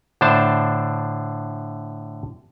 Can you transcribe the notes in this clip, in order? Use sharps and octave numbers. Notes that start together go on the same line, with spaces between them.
A2 D3 D4 C5 A5